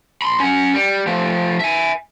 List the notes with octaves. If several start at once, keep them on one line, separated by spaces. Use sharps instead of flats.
B5 C6
C#4 F#5
G3
F3 A3
E5 G#5